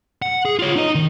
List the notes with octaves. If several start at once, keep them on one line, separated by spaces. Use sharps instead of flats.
F#5
G#4
F4 C#5
D#4 D#5
D#3